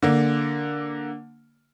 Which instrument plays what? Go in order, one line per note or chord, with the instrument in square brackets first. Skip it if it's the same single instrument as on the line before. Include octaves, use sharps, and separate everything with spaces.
[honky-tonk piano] D3 A#3